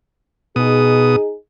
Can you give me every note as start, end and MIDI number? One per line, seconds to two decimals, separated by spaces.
0.56 1.16 47
0.56 1.34 63
0.56 1.34 68
0.56 1.16 87